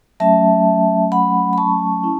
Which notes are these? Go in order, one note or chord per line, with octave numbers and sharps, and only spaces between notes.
F#3 A3 C#4 E5 A5
F#5 B5
B5
A5 C#6
C#4 E4